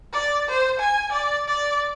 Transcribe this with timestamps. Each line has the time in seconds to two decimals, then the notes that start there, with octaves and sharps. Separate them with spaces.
0.13 D5
0.49 C5
0.80 G#5
1.12 D5
1.47 D5